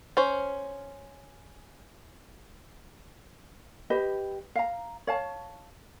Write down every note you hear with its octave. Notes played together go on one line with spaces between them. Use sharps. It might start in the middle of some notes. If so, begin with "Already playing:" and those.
C#4 C5
G4 B4 D#5
F5 A#5
C#5 F5 A5